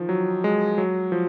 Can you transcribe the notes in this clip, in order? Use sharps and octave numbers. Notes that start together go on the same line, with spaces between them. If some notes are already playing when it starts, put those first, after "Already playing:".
Already playing: D#3 F3
F#3
G#3
F#3
F3